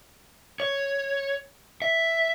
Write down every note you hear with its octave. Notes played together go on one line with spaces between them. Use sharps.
C#5
E5